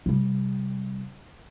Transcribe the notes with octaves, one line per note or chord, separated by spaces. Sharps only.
C3 G3